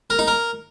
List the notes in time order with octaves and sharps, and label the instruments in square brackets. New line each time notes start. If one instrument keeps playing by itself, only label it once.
[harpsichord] A#4
D#4
A#4